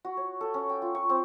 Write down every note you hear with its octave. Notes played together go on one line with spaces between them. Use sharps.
F#4
C#5
A4
C#4
G5
F4
C#6
C4